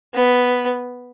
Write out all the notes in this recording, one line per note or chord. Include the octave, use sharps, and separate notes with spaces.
B3